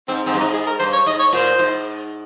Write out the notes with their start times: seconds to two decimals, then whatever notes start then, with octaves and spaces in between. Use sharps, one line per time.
0.08 G#2 C4
0.26 G#2 C4
0.34 G2
0.40 G#2 D#4
0.53 G#4
0.66 A#4
0.79 G2 C5
0.93 C#5
1.06 G#2 D#5
1.19 C#5
1.33 A#2 C5
1.59 G#2